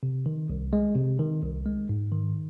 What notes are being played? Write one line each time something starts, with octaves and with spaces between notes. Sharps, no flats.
C3
D#3
C2
G#3
C3
D#3
C2
G#3
G#2
D#3